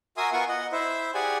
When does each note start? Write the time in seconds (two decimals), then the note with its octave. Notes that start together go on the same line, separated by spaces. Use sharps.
0.17 F#4 A#4 E5 G#5 C6 D#6
0.33 B3 F4 A#4 F#5 G#5 C#6
0.48 D#5 F#5
0.72 E4 C5 E5
1.14 G4 G#4 D5 F#5 G#5